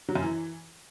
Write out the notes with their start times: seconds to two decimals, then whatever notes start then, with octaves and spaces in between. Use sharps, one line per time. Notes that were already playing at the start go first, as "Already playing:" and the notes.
0.09 F#3
0.15 F#2
0.22 E3